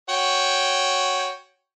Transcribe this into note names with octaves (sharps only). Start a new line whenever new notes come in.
F#4 C#5 G5